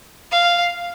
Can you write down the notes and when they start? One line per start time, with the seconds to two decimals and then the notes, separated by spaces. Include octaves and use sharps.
0.31 F5